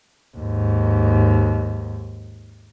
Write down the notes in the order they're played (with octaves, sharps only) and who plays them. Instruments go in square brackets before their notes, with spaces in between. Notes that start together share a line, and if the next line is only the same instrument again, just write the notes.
[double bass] D#2 G#2